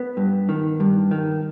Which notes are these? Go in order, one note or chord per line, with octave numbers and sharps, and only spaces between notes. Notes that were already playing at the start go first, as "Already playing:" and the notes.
Already playing: B3
G2
D#3
G2
D#3